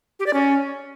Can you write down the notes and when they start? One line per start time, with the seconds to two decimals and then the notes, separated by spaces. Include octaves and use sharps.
0.20 G4
0.27 D5
0.34 C#4